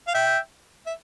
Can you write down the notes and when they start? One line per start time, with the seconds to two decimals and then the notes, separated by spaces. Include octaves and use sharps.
0.08 F5
0.15 E5 G5
0.86 E5